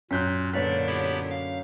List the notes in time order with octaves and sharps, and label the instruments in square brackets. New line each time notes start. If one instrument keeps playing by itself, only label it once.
[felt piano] F#2 [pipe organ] A#2 [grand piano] F#6 G6 B6
[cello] A#2 D3 [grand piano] B4 C#5 B6 [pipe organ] D5 F6
[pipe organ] B3 E4 G4
F5